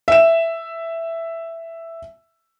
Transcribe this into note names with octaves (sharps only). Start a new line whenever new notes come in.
E5 E7